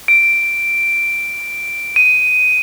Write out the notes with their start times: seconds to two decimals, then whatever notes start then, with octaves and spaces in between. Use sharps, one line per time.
0.08 D7
1.96 D#7